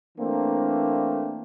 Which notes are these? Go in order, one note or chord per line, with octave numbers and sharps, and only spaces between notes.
E3 A3 A#3 C4 D4